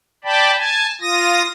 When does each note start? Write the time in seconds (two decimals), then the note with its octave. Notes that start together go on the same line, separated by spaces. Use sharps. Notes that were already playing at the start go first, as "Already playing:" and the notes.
0.24 D5 G5 A5 B5
0.56 G#5 A5
1.01 F4 D#6 A#6